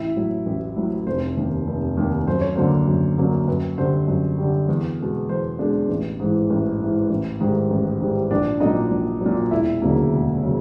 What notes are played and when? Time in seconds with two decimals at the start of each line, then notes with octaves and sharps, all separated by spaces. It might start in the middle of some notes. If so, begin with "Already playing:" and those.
Already playing: A1 E4 E5
0.16 A2 F#3
0.46 A1
0.76 A2 F#3
1.06 F1 C5
1.37 D#2 D#3
1.67 F1
1.97 D#2 D#3
2.27 F#2 C5
2.41 C#5
2.55 D3 F#3 A#3 C5
2.88 F#2
3.18 D3 F#3 A#3
3.48 F#2 B4
3.78 D3 G3 C5
4.08 F#2
4.38 D3 G3
4.69 E2
4.99 B2 G#3
5.29 E2 C5
5.59 B2 G#3 D4 D5
5.89 A1
6.20 G#2 E3
6.50 A1
6.80 G#2 E3
7.09 A1
7.40 G#2 D#3 G3
7.70 A1
8.01 G#2 D#3 G3
8.31 A#1 D4 D5
8.60 A#2 F#3 D#4 D#5
8.91 A#1
9.21 A#2 F#3
9.51 E1 E4 E5
9.82 D2 C#3 F#3 A#3
10.12 E1
10.44 C#3 F#3